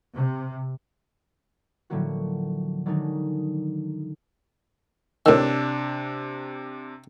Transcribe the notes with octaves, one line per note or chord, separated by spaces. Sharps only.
C3
A2 D3 F3 F#3 A#3 F#4
D3 D#3 F#3 G#3 D4 D#4
A2 C3 D#3 D4 E6